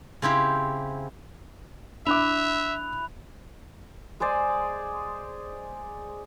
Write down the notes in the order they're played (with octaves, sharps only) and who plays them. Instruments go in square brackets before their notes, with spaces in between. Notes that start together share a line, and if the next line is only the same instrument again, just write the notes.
[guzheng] C#3 C4 E4 G4
[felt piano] D4 D6 [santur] E4 [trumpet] E5 [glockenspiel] F#6 F7
[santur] G#3 G#4 C5 D5